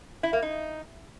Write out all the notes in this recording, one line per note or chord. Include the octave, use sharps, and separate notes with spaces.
E4
A#3
D#4